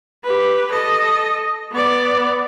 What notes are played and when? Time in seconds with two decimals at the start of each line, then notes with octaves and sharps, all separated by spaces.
0.24 G4 B4
0.71 A4 D#5
1.71 B3 D5